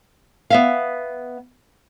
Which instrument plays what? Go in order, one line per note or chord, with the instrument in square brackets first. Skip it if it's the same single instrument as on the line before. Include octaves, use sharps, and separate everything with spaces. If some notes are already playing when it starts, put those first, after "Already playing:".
[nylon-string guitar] B3 E5 F5